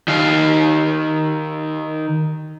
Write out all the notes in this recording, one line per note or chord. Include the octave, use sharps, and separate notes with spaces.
D#3 F5